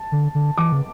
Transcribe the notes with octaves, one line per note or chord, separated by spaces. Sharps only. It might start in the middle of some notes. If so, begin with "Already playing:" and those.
Already playing: A5
D3
D3
E3 D6
C#3